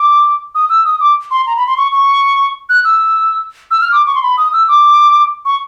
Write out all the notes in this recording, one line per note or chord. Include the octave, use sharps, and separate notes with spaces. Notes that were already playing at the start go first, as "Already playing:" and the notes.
Already playing: D6
D#6
E6
D#6
D6
C6
A#5
B5
C6
C#6
C#6
F#6
E6
E6
F6
D6
C#6
C6
B5
D#6
E6
D6
C#6